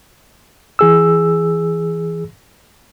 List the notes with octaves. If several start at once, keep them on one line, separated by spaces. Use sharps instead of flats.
E3 G#4 E6